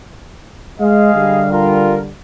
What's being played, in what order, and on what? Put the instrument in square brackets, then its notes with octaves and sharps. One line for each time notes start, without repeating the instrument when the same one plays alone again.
[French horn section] G#3 [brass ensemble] G#4 D#5 F5
[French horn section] D3 G3
[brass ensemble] F4 A#4